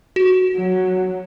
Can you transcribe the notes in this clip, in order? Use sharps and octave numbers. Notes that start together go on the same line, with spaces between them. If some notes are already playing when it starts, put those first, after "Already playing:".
F#4
F#3